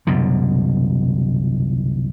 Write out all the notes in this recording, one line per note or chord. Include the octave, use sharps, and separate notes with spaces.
C2 F#2 B2 D3